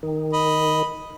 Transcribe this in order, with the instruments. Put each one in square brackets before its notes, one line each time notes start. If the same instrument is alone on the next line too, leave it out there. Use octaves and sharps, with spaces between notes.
[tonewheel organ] D#3
[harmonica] D#5 B5